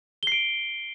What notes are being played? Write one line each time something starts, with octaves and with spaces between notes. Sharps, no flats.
C7 D7 G7